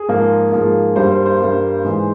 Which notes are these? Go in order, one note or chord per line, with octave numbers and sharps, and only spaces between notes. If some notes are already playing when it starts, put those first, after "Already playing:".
Already playing: G#4
G#2 F3 A#3
G#2 F3 A#3
G2 G3 A#3 C5
C5
C5
G2 G3 A#3
G#2 E3 G#3